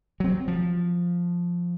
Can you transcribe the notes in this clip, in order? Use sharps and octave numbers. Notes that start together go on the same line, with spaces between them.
F#3 C4
F3